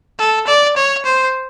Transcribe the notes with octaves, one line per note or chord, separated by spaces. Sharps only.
A4
D5
C#5
C5